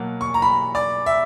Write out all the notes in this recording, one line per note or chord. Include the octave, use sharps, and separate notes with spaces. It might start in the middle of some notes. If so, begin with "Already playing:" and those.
Already playing: B2 F#3 A#3
C#6
A#5
B5
D5
E5